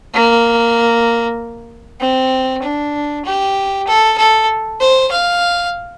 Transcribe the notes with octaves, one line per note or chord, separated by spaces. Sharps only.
A#3
C4
D4
G4
A4
A4
C5
F5